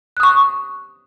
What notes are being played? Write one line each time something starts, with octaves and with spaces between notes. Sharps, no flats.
C#6 D#6 F#6